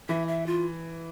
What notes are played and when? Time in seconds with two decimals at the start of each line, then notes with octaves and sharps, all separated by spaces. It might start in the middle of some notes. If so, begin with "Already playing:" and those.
0.09 E3 E5
0.28 E5
0.46 F4